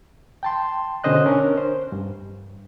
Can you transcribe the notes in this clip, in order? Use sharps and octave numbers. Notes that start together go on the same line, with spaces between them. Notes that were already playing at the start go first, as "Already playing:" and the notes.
G5 A5 C6
B2 D3 C#4 C5 D#5 F#6
C#4 D4 A#4
C5
G2